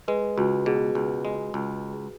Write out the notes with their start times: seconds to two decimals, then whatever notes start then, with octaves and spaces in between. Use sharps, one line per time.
0.08 G#3 B4
0.38 C#2 F#4
0.66 B2 G#4
0.95 C#2
1.25 G#3
1.54 C#2